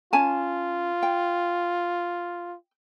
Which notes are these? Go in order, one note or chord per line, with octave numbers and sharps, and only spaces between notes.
C#4 F4 G#5 A5
G5